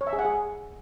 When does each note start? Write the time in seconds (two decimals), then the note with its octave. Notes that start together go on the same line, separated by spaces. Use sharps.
0.01 C#5
0.07 E5
0.13 G#4
0.19 F#5
0.25 G#4